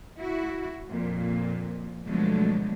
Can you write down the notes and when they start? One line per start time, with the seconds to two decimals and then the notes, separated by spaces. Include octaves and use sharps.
0.18 E4 F#4
0.88 F2 A#2
2.06 B2 D3 F3 F#3 G#3 A3